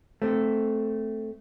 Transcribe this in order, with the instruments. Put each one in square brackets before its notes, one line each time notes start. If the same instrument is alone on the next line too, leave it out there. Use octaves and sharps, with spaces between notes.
[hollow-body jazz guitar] A3 C4